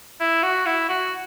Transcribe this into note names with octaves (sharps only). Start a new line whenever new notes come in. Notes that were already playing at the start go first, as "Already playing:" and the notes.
E4
F#4
E4
F#4